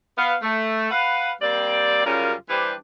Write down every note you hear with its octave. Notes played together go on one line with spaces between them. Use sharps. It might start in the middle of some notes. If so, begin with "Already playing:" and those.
B3 F5
A3
B4 F5 F#5
G3 A#3 C4 D5
F#2 C#3 G3 C#4 F4 A#4
E3 G3 D4 G4 B4 C5